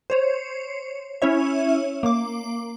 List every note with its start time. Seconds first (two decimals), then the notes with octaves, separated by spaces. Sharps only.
0.10 C5 C#5
1.22 C#4 E4 C#5 E5
2.03 A#3 D6